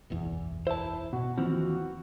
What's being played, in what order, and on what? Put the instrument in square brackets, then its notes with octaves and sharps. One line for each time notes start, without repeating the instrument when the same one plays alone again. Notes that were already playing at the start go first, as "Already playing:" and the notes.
[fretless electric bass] F#1 B1 E2
[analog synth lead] E4 [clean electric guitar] C5 A5
[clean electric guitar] B2 [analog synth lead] F#4
[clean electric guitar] D#2 E3 F3 [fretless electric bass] C4